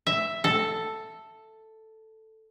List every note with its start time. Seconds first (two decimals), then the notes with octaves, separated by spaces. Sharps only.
0.07 E5
0.44 A4